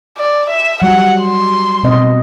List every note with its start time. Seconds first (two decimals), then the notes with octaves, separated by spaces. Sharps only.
0.17 D5
0.49 E5
0.82 F#3 G3 F#4 F#5
1.21 C6
1.83 B2 C4 D#5